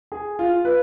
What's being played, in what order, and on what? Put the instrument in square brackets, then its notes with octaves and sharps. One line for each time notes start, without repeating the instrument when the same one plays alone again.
[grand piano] G#4
F4
B4